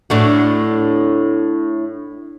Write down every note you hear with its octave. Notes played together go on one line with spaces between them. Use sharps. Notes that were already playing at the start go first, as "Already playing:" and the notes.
A2 D4 F#4